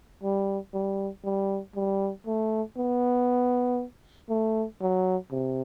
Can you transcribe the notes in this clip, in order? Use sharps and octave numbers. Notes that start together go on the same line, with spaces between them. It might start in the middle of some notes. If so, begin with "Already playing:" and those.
G3
G3
G3
G3
A3
B3
A3
F#3
C3